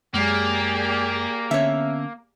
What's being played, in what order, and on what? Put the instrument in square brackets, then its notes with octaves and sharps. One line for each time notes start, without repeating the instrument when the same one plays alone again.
[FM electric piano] F#2 G#3 [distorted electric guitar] A#3 [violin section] G4 G#4 D5
[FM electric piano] D3 B3 C#4 [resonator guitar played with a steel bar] C#5 E5